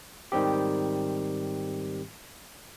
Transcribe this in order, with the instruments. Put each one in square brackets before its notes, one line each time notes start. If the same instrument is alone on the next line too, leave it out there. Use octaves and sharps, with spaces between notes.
[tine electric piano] G#2 D#3 G3 C4 G4